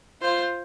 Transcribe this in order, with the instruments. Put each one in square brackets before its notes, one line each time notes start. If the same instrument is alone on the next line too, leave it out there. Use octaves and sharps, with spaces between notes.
[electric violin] F4 [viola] C5